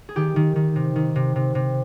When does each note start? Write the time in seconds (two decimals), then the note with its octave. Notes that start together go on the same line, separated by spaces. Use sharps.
0.09 G#4
0.16 D#3 G4
0.36 D#3
0.56 D#3
0.76 C3
0.96 D#3
1.16 C3
1.36 C3
1.55 C3